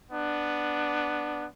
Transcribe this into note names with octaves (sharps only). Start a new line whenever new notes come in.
B3 D4